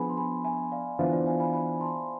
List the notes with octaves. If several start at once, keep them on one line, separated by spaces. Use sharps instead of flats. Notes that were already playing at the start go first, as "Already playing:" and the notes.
Already playing: F3 B3 D4 G#4 G#5 B5
C6
G#5 B5
E5 G#5
D5 F5
E3 B3 D4 F4 C5 E5
D5 F5
E5 G#5
G#5 B5
G#5 B5
A5 C6